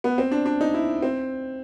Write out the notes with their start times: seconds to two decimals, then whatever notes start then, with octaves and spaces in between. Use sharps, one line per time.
0.04 B3
0.18 C4
0.32 D4
0.46 D4
0.61 D#4
0.74 E4
1.03 C4